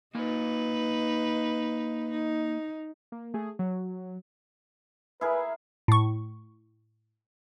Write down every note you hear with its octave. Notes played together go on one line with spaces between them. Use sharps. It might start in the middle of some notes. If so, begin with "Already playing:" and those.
A#3 D#4 B4 G#5
D#4
A#3
A3 G#4
F#3
E4 G#4 A#4 B4
A2 C#6